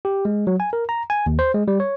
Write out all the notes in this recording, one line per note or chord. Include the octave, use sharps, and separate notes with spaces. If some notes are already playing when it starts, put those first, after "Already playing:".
G4
G#3
F#3
G#5
A#4
A#5
G#5
D#2
C5
G#3
G3
C#5